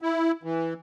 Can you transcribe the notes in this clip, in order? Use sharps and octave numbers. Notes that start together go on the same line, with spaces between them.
E4
E3